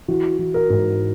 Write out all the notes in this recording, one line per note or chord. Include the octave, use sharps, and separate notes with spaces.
E3 F#4
E3
A#4
G#2